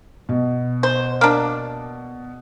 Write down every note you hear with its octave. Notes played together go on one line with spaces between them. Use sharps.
B2
C5
A#3 D4